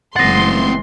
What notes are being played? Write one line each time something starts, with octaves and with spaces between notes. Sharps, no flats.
F#1 E3 G#3 C4 F#5 C6 A6 A#6